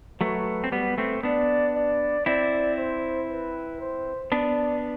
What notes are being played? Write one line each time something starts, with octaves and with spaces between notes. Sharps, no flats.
F#3 A3 B4
C4
G3 B3 B4
A3 C4
B3 D4 D5
D5
C4 E4 D5
C5
B4
C5
B3 D4 D5